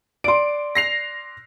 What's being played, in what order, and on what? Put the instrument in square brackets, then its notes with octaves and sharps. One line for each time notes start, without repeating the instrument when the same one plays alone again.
[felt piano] D5 C6 [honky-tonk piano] D7
[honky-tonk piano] A#6 C7 F7